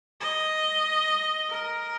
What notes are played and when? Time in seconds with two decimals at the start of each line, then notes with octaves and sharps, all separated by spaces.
0.21 D#5
1.50 A#4